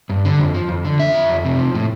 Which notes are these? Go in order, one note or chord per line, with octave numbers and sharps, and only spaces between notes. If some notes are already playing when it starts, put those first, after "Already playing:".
G2
D3
F2
F3
F2
D3
F2 E5
F3
F2
C3
F3
A2